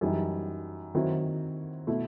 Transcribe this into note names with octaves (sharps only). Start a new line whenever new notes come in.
F#2 E3 G3 D#4
D#3 F#3 C4 E4
B2 A3 E4